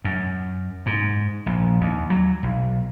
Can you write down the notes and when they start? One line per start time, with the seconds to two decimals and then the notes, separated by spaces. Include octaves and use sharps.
0.04 F#2
0.86 G#2
1.46 A#1
1.81 D#2
2.10 F#3
2.43 B1